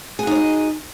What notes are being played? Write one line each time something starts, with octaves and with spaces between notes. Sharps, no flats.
D#4 F#4 G#4 C#5 D#5